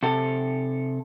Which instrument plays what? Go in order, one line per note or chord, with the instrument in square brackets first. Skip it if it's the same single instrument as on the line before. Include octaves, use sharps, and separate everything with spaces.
[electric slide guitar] C3 A4